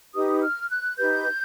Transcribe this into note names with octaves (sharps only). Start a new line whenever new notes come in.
D#4 G4 B4 D#6
F6
F#6
D#4 G4 B4 G6